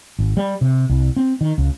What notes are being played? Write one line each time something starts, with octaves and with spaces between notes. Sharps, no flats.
G#1
G3
C3
C2
C4
D#3
C#2